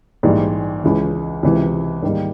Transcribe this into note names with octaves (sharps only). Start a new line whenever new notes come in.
A#1 G#2 E3 G3
C#2 C#3 E3
C#2 C3 E3
G#2 D#3 G3 A#3